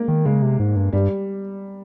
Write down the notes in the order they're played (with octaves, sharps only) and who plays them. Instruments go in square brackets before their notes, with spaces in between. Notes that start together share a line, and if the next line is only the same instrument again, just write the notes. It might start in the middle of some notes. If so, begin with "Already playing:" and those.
Already playing: [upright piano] G#3 A#3
[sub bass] D#3
[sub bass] C#3 [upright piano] G#3
[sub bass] C3
G#2
G2
[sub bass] G2 [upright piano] G3